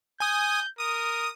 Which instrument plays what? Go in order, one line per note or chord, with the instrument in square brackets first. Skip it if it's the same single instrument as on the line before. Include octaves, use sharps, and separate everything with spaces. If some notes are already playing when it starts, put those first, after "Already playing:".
[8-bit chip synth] G#5 D#6 [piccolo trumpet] G6
[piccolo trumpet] A#4 [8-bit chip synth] D#6